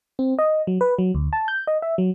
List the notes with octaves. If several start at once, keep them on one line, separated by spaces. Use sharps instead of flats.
C4
D#5
F#3
B4
F#3
D2
A5
G6
D#5
E5
F#3